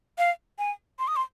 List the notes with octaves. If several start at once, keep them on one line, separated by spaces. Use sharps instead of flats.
F5
G#5
C6
D#6
C6